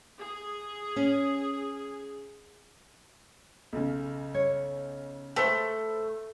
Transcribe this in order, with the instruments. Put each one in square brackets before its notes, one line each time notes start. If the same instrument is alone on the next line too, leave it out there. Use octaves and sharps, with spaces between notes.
[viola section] G#4
[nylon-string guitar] C#4
[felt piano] B1 C#3
[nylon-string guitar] C#5
[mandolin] A3 [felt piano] A4 B4 C5